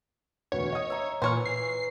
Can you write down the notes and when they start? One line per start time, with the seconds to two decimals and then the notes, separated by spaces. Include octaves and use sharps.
0.52 E1 D2 B4 C#5
0.73 D#5 D#6
0.90 E5 A#5
1.22 A#2 E3 C5 C#5 G#5 F6
1.46 C7